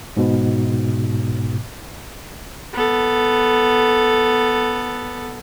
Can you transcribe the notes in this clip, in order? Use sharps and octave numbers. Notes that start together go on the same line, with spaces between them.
G#2 B2
B3 A4